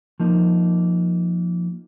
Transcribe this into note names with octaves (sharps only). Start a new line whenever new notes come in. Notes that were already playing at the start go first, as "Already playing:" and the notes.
F3 A#3 D#4